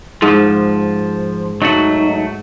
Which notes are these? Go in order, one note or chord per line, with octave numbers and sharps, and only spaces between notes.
G#2 F3
F#3 A3 D#4 F#4